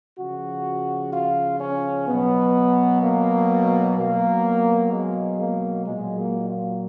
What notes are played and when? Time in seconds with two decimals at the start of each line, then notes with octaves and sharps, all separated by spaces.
0.19 C#3 F3 F#4
1.13 F4
1.60 C#4
2.08 B2 F#3 B3
3.03 A#3
3.98 B2 F#3 A#3
4.92 G#3
5.40 A#3
5.87 A#2 F#3 G#3
6.19 A#3
6.50 F4